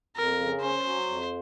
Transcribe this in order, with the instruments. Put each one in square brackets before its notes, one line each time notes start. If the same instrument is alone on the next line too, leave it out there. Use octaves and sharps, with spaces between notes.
[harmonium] F2 [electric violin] A#4
[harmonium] C#3
[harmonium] C#4 [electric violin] C5
[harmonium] F#3
F2